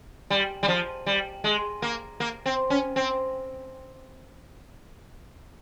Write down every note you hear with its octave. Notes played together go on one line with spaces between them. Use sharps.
G3
G3
F3
G3
G#3
A#3
A#3
C4
C#4
C4